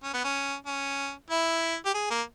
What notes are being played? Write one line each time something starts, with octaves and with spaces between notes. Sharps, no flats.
C#4
B3
C#4
C#4
E4
G4
G#4
A#3